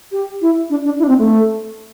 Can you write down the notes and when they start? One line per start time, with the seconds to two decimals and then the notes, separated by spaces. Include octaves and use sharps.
0.12 G4
0.41 E4
0.70 D4
0.85 D4
0.99 E4
1.03 D4
1.08 C4
1.18 A3